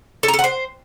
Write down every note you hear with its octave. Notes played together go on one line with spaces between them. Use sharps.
A4
A#5
A4
F#5
C5